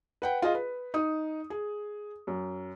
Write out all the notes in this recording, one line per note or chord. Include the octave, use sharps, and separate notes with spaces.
B4 F#5 G5
F4 G#4 D#5
B4
D#4 D#6
G#4
F#2